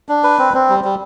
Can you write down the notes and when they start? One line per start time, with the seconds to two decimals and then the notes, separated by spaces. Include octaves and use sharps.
0.09 D4
0.24 B4
0.38 C4
0.54 C4
0.69 G3
0.84 G3